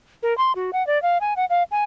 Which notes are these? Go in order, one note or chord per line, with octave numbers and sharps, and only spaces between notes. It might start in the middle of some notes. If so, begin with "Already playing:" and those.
A#4
C6
F#4
F#5
D5
F5
G#5
F#5
F5
G#5